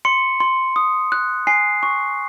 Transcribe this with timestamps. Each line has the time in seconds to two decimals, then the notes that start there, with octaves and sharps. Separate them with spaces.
0.05 C6 C#7
0.40 C6
0.76 D#6
1.12 F#6
1.47 G#5 C7
1.83 C#6